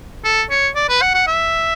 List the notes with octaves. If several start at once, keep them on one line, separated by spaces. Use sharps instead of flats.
A4
C#5
D5
B4
F#5
F#5
E5